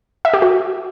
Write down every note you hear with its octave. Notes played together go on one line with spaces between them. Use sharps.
E5
G4
F#4